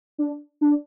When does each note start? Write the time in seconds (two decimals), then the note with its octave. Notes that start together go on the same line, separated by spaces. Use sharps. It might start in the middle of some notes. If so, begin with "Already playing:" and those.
0.18 D4
0.61 D4